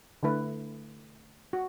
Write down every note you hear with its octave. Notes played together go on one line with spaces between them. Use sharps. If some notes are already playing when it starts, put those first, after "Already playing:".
D3 A3 E4 B4
F#4